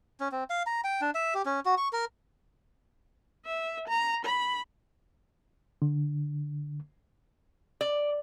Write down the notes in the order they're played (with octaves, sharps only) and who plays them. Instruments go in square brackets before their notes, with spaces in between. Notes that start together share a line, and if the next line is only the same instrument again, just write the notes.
[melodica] C#4
C4
F5
A#5
G5
D4
E5
G4
C#4
F#4
C#6
A#4
[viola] E5
A#5
B5
[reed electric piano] D3
[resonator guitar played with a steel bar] D5